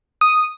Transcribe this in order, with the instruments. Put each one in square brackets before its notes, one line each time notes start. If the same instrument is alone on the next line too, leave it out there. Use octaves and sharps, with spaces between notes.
[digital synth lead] D#6